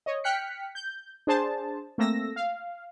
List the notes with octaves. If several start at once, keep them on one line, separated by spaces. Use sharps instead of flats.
C#5 D#5
G5 F6 F#6 B6 C#7
G6
D4 G#4 C5 A5
A3 A#3 C4 E6 A#6
F5